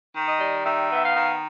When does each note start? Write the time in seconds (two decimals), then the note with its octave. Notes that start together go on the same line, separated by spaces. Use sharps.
0.15 D#3
0.28 D#5
0.40 G3
0.66 D#3 E5
0.91 B3
0.96 E5
1.04 F5
1.16 D#3